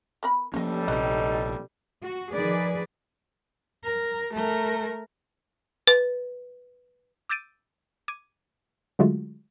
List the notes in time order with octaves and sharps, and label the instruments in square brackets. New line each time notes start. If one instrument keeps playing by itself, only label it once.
[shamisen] B3 A#4 B5
[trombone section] A1 G3 A4 [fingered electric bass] F3 A#3 C#4 [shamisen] C5 D#5
[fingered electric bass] A#1 C3 [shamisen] C4 B4 [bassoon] D#4
[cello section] F#4
D#3 F3 G#4 B4 D5
[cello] A#4
A3 A#4
[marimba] B4
[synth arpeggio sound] D6 E6 G6 A6 D7 D#7
D6 G#6 D#7
D3 F#3 G#3 A3 F4 F#4